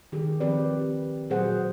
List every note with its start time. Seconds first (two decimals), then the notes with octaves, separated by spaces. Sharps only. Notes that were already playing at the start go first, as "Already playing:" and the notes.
0.12 D#3 G4 G#4
0.40 D#3 F3 C4 G4 B4 D5
1.30 A#2 F#3 G#4 C5 F#5